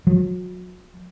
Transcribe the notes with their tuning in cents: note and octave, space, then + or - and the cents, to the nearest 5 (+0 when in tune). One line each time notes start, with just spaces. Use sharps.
F#3 -35